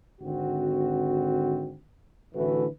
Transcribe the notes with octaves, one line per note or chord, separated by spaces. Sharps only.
G#1 D3 C4 F#4
A1 D3 E3 A3 F#4 B4